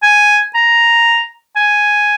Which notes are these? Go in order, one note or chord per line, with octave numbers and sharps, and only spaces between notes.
G#5
A#5
G#5